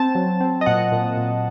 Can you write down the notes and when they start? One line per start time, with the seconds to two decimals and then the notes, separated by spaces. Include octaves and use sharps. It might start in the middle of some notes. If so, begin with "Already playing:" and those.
Already playing: C4 A5
0.15 F#3
0.40 C4
0.61 D#5
0.66 A#2 F#5
0.92 A#2
1.17 A#2